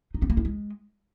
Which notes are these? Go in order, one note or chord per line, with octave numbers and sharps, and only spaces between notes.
D#4
C4
A#3
E4
G#3